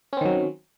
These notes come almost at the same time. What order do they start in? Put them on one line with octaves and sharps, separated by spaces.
C#4 C4 D#3 F#3